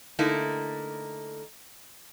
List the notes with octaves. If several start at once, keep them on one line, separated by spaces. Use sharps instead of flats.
D3 A3 A#3 D#4 E4